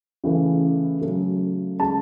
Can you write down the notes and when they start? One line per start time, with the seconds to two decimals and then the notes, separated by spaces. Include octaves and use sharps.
0.24 C#3 E3 A3
1.01 C#3 F#3 A3
1.79 C#3 G#3 A5